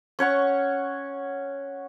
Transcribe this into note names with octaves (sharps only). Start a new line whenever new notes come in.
C#4 C#5 F#5 C#6